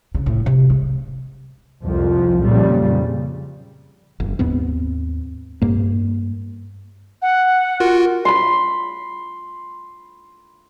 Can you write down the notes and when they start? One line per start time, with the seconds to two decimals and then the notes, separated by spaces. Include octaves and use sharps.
0.15 C#3
0.26 A2
0.46 C3
0.70 G#3
1.84 C2 F2 F3
2.43 F2 A#2 C#3 G3
4.20 F#1
4.39 D#2 G#2 B3 C4
5.62 G2 A#3
7.22 F#5
7.80 F4 F#4 A#4
8.25 B5 C6